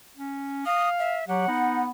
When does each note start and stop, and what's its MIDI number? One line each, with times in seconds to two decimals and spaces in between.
0.17 0.64 61
0.66 1.19 77
0.66 0.89 87
0.99 1.25 76
1.28 1.47 54
1.28 1.43 67
1.28 1.84 78
1.48 1.89 59
1.48 1.84 63